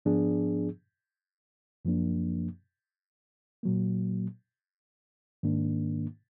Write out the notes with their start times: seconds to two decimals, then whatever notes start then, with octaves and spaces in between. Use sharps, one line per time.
0.05 G#2 F3 B3 D4 G#4
1.85 F#2 F3 A#3 D4
3.63 A#2 F#3 A#3
5.43 G#2 D#3 A#3 D4